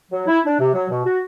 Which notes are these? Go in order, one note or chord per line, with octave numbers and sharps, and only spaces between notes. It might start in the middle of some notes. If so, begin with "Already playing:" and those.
F#3
E4
D4
C3
F#3
B2
F#4